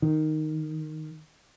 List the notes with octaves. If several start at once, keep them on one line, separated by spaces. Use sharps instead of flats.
D#3